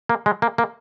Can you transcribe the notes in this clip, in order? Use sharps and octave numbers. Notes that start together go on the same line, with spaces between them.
A#3
G#3
A#3
A#3